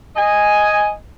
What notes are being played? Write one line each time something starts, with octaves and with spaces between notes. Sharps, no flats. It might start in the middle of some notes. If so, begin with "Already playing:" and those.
D#5 G#5